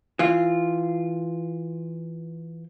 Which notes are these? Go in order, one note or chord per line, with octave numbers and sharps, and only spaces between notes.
E3 F4